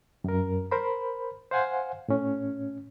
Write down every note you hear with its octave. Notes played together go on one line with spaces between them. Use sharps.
F#2 A#4
A#4 C5 B5
C5 F5 F#5 G#5
A2 C#4